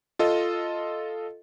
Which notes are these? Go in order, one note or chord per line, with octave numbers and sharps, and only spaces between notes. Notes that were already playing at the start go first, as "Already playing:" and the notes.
F4 A4 D#5